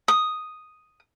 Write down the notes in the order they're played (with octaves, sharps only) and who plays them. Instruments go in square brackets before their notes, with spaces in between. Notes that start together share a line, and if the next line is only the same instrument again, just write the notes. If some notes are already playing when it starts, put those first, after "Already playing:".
[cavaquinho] D#6